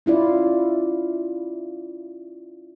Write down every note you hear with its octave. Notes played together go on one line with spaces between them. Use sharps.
C#4 E4 F4 D5